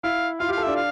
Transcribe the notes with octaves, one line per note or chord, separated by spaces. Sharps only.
E4 F5
F4 F5
G4
F5
A4
E5
D4
F5